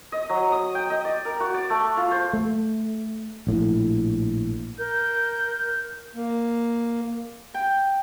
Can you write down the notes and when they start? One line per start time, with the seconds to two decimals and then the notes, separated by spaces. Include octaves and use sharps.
0.12 D#5
0.29 F#3
0.52 D#6
0.75 G5
0.90 D#5
1.05 D5
1.25 A#4
1.40 F#4
1.54 D5
1.70 A3
1.97 F4
2.11 C5
2.33 A3
3.47 A#1 A2
4.79 A#4 G6
6.14 A#3
7.54 G5